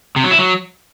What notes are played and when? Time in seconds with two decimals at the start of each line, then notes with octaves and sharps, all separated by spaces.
0.16 C3
0.24 F#3
0.31 E4
0.39 F#3